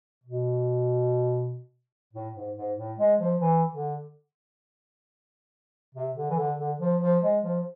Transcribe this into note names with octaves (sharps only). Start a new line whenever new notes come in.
B2
A2
G#2
G#2
A2
G#3
F3
E3
D3
C3
D3
E3
D3
D3
F3
F3
G#3
F3